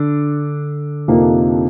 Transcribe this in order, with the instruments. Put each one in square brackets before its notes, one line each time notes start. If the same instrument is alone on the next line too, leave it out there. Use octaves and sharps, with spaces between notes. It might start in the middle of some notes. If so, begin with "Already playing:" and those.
Already playing: [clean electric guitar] D3 D4
[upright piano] F2 C3 F3 A#3 D#4